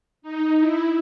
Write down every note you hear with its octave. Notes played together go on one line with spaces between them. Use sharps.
D#4
E4